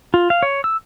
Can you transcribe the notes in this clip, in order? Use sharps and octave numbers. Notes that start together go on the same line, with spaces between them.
F4
F5
C#5
E6